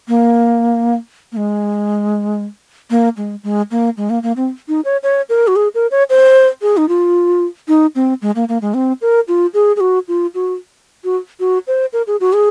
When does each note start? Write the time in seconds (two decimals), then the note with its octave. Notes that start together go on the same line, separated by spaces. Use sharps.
0.08 A#3
1.32 A#3
1.37 G#3
2.90 A#3
3.17 G#3
3.43 G#3
3.71 A#3
3.97 G#3
4.10 A#3
4.23 A#3
4.36 C4
4.68 D#4
4.85 C#5
5.03 C#5
5.29 A#4
5.47 F#4
5.56 G#4
5.75 A#4
5.91 C#5
6.10 C5
6.62 G#4
6.77 D#4
6.89 F4
7.68 D#4
7.95 C4
8.22 G#3
8.36 A#3
8.49 A#3
8.62 G#3
8.74 C4
9.02 A#4
9.28 F4
9.54 G#4
9.76 G#4
9.80 F#4
10.08 F4
10.35 F#4
11.04 F#4
11.40 F#4
11.67 C5
11.93 A#4
12.07 G#4
12.20 F#4
12.33 G#4